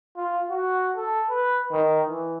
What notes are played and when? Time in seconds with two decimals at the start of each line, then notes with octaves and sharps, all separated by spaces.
0.17 F4
0.50 F#4
0.96 A4
1.30 B4
1.71 D#3
2.09 E3